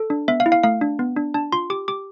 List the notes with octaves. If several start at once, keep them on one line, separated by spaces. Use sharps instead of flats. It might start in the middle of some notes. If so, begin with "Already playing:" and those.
Already playing: A4
D4
B3 E5
F5
E4
F5
A3 F5
D4
B3
D4
D4 A5
F4 C6
G4 D6
G4 D6